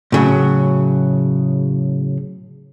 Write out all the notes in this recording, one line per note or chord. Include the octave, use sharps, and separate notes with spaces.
A2 C#3 F#3